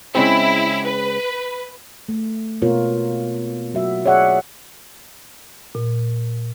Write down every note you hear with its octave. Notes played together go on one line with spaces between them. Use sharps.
C#3 G#3 C4 E4
B4
A3
B2 A#3 B3 F4 A#4 C#5
F#3 F#4 E5
G#4 C#5 D5 E5 F#5
A#2